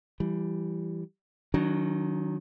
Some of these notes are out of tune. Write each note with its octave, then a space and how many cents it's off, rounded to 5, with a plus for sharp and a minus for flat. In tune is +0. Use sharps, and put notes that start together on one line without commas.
E3 +25 G3 +0
D#3 +0 F#3 +0 D4 -35